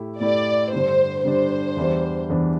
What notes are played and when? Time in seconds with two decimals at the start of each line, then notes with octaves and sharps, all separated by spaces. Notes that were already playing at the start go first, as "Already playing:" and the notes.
Already playing: A2 A3 E4 G4
0.20 A2 A3 E4 G4 D5
0.72 G2 D3 G3 D4 C5
1.24 G2 D3 G3 D4 C5
1.77 E2 E3 G3 D4
2.30 E2 E3 G3 D4